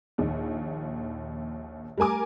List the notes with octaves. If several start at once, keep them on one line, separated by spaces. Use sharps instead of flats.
A#1 D#2
G3 A3 A#4 G#5 D6